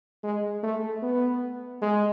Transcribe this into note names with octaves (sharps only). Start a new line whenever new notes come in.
G#3
A3
B3
G#3